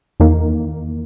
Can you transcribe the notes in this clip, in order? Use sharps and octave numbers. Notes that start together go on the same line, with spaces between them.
E2 D#3 A#3